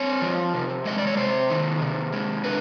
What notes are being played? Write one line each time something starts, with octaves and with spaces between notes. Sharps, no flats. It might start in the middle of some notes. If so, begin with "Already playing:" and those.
Already playing: C4 C#5
F3
C3
G#3 D#5
D5
C#5
C3 C5
D#3
C3
G#3
D3 B4